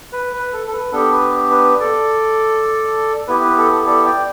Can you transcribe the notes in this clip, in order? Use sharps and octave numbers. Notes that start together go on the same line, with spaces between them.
B4
B4
A4
A4
B4
B3 D4 G4 A4
B4
B4
A4 D5
B3 E4 G4 B4
B4
A4
A4
A4 D5
D5 G5